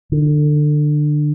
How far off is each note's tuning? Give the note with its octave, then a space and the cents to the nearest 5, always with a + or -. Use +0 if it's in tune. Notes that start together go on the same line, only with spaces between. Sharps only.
D3 +25